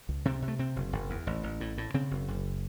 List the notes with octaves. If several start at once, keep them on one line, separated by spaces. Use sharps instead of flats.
C#2
C3 C4
C3
A3
C3 C4
F#1
F#1
E2
A1
A1
A2
A2
C#3 C4
F#1
F#1